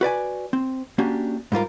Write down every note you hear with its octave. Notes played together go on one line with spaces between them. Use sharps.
F#4 B4 D5 G#5
C4
A#3 C#4 D4 F#4 G4
G#2 G3 F4 A#4